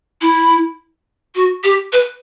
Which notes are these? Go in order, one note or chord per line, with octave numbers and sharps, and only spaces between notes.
E4
F#4
G4
B4